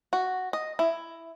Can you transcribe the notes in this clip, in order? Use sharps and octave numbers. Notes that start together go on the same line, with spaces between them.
F#4
D#5
E4